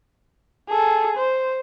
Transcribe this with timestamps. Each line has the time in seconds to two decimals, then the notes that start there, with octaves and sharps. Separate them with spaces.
0.69 G#4 A4
1.17 C5